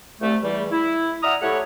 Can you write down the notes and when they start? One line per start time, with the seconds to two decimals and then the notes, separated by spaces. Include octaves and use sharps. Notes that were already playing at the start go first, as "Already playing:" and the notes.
0.20 C2 A3
0.43 E2 E3 G3
0.71 E4
1.23 D5 E5 F#5 A#5 D#6 F6
1.42 A2 A3 E4 G4 C#5 F#5